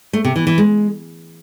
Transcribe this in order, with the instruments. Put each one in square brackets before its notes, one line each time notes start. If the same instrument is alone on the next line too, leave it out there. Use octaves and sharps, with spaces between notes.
[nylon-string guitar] A3
C3
E3
E3
G#3